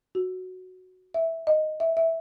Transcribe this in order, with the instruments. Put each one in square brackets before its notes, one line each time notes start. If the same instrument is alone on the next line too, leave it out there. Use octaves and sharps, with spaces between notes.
[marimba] F#4
E5
D#5
E5
E5